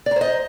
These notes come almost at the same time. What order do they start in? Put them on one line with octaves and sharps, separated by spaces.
D5 A#5 C5 D#5